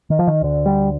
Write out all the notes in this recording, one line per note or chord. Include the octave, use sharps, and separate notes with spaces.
D#3
F3
D#3
D2 D3
G3